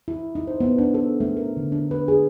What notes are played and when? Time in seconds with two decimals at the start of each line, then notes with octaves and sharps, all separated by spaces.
0.08 E4
0.35 D#4
0.47 C5
0.61 B3
0.78 D4
0.94 A4
1.20 A3
1.37 A#4
1.57 D3
1.72 D4
1.91 B4
2.08 G#4